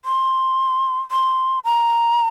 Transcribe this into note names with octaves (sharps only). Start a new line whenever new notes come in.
C6
C6
A#5